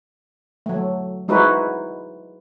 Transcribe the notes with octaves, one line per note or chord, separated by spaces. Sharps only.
F#3 A3
G#3 D#4 E4 F#4 B4 C5